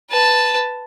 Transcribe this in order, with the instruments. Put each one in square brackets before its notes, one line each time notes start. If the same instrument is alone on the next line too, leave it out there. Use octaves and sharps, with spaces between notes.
[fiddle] B4 A5